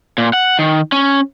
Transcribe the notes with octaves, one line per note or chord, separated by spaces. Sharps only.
A#2
F#5
D#3
C#4